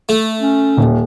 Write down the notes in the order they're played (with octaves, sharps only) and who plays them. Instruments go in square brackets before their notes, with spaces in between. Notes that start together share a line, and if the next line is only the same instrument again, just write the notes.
[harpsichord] A3
[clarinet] C#4
[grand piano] D#1